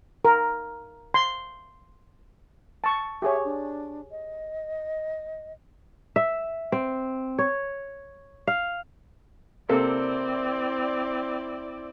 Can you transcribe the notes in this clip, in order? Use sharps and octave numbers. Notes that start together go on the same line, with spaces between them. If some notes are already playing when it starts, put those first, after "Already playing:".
A#4
C6
A5 C#6
G4 G#4 C#5 E5
D4
D#5
E5
C4
C#5
F5
C3 A#3 C4 E4 A4 D5